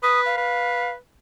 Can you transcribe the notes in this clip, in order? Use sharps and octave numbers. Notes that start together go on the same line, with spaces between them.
B4 D#6
F5
B4